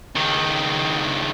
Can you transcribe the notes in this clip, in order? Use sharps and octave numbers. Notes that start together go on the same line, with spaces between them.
C#2 D#3